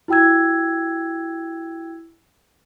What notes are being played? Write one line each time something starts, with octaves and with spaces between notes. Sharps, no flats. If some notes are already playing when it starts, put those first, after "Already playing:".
E4 F#4 G5 E6 G#6